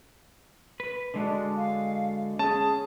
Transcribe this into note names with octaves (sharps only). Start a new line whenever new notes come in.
B4
D3 G#3 D4 F#4
F5
C#4 G#4 A5